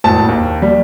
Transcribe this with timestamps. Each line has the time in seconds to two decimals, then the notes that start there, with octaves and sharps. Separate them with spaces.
0.04 G#1 A2 A5
0.28 D#2
0.62 G3